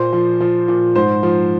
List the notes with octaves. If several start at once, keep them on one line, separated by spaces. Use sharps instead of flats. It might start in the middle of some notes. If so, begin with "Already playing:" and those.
Already playing: A#2 C5
F3
F3
A#2
G#2 C5
F3